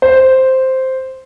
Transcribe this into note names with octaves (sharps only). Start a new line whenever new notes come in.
C5